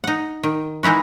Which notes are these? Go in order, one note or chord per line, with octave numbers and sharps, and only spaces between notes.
D#4 F#5
D#3
E3 G#3 D#4 E4 F#4